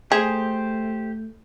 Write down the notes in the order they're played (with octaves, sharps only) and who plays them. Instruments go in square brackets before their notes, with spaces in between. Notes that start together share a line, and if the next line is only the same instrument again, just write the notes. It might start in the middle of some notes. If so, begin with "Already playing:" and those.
[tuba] A3 [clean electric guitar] G4 C5 [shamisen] G#4